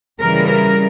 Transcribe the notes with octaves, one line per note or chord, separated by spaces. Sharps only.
C#3 E3 G3 A#4
A#4